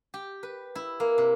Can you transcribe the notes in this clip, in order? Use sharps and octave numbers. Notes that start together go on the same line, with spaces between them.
G4
B4
E4
A#3
C3